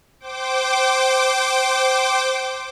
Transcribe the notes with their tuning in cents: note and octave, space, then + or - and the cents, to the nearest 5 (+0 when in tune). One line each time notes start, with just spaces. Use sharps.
C5 +0 G5 -30 D6 +0